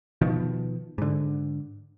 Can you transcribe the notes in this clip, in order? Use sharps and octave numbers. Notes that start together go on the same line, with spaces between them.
B2 D#3 F3
G#2 D3